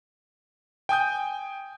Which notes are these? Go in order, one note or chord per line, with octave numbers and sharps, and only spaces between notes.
G5 G#5 D#6 G6